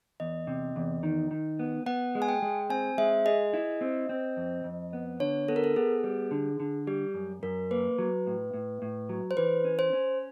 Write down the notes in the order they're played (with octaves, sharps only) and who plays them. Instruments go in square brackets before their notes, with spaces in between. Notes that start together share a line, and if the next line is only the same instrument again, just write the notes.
[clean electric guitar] E2 [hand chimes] D#5
[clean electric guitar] C3
E2
D#3
D#3
B3
[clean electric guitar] B3 [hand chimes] F#5
[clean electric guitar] G#3
[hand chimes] G#5
G5
[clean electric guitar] G#3
[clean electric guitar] C4 [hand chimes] G#5
[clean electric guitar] G#3 [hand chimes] E5
[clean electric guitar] G#4 [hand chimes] D#5
[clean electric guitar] E4
C4
C4
F2
F2
B3
[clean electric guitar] D3 [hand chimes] C#5
[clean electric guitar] B3 [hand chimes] A4
[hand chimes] A#4
A4
[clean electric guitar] B3 [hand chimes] G#4
[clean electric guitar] G3
D3
D3
[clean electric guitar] G3 [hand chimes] G4
[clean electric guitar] F#2
[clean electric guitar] F#2 [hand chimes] A#4
[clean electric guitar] A#3 [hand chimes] B4
[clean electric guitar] F#3
A2
A2
A2
F#3
[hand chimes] C5
[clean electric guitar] E3 [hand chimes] B4
[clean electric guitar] C#4
[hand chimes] C5
[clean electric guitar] C#4